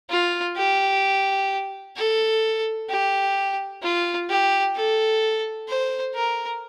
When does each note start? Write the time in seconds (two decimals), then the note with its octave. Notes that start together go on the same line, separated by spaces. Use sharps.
0.10 F4
0.57 G4
1.96 A4
2.89 G4
3.83 F4
4.29 G4
4.75 A4
5.68 C5
6.15 A#4